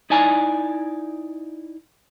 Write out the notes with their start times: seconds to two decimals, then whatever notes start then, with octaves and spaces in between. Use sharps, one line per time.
0.10 D#4 E4 D5 G#5 A#5